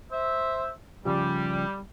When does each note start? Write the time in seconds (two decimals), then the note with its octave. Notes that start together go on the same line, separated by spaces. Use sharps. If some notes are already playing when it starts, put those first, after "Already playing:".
0.12 C5 E5
1.05 C#3 F3 G3 G4